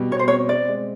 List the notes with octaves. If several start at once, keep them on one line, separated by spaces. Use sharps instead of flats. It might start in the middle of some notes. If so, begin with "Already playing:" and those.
Already playing: B2 G3
B2 C#5
C5
C#5
C4
C4 D5
G#3